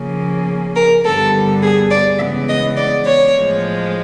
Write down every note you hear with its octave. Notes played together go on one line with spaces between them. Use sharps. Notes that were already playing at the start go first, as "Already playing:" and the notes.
Already playing: C#3 F3 A#3 C#4
A#4
G2 D3 G3 B3 A4
G#4
D5
C#3 E3 G#3 B3 E5
D#5
D5
C#5
A2 F3 G#3